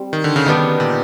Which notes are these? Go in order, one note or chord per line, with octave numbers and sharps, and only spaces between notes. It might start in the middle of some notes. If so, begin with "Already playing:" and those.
Already playing: G3 C4
D#3
D3
C#3
D#3 G3 B3 D4 G4
A#2